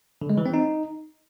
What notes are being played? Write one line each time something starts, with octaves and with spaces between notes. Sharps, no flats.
D3
G#3
E3
C4
D#4